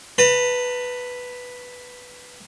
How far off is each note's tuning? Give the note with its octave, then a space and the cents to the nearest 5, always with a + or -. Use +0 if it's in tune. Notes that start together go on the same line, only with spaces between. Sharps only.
B4 +0 A5 +45